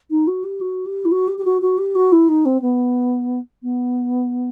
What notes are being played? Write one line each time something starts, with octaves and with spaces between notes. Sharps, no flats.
D#4
F#4
G4
F#4
G4
E4
F#4
G4
G4
F#4
F#4
G4
F#4
E4
D#4
C4
B3
B3